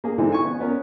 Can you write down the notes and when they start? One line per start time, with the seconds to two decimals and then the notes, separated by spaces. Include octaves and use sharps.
0.04 A#3 G#4
0.18 D3 E3 G#3 C4 D#4
0.32 G#5 C#6
0.44 B3
0.60 B3 C#4 A#4